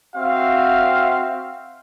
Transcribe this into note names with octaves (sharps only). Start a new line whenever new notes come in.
C4 F#4 E5 F5